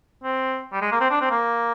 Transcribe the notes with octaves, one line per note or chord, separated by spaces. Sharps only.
C4
G3
G#3
A#3
C4
D4
C4
A#3